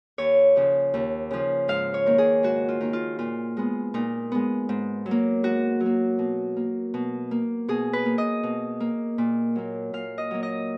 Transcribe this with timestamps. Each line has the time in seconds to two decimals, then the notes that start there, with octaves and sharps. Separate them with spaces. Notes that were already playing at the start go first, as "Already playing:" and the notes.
0.18 D#2 C#5
0.56 C#3 F3
0.94 D#2
1.31 C#3 F3
1.68 G#2 F5
1.94 C#5
2.06 D#3 A#3
2.18 G#4
2.43 G#2 F#4
2.69 F4
2.80 D#3 A#3
2.93 F4
3.19 A#2 F4
3.57 G#3 B3
3.94 A#2 D#4
4.32 G#3 B3
4.69 G#2
5.06 F#3
5.11 A#3
5.43 G#2 F#4
5.80 F#3
5.86 A#3
6.19 B2
6.57 A#3
6.94 B2
7.31 A#3
7.68 B2 G#4
7.93 B4
8.06 A#3
8.18 D#5
8.43 B2
8.80 A#3
9.18 A#2
9.55 F#3 A#3
9.93 A#2 F5
10.18 D#5
10.31 F#3 A#3
10.43 D#5